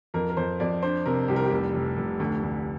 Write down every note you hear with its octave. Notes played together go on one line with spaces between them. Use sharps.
F2 A#4
A#4
F2 C5
F2 D5
D4 C5
C3 A#4
C2 G4
A#4
G4
F1
F1
F1
D2
D2